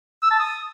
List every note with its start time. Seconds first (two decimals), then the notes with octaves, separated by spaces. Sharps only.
0.23 E6
0.31 A5
0.39 D#6